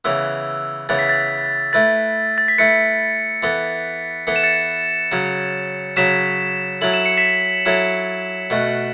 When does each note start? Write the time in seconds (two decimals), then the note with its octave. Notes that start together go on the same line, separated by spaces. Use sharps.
0.05 C#3 E3 B3 E6
0.89 C#3 E3 B3 A6
0.99 B6
1.09 A6
1.73 A3 E4 B4 A6
2.38 A6
2.48 B6
2.58 A3 E4 B4 A6 C#7
3.43 E3 B3 A4
4.27 E3 B3 A4 C#7
4.36 E7
4.43 A6 C#7
5.12 C#3 F#3 C#4
5.96 C#3 F#3 C#4 B6 E7
6.81 F#3 C#4 E4 A4 F#7
6.94 E7
7.06 C#7
7.17 B6 E7
7.66 F#3 C#4 E4 A4
8.50 B2 A3 F#4